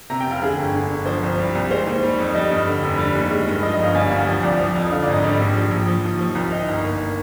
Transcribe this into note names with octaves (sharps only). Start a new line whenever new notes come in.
C3 A#5
G5
F1 F5
D3 G#4
G1
D3
G1
F3 C5
C2
G3
C2
G#3 C5
D#2
G3
F2
G3 D#5
G2
D3
F1
G3
D#2
G#3
G2
F3 D#5
D#5
G1 F5
G3 G#5
F5
D2
F3
C2 D5
F3
F2
D3 F5
D5
G#1
D#5
G3 D5
A#1
F3
A#1
F3
D#2
F3
C2
D#3 D#5
G1
A#3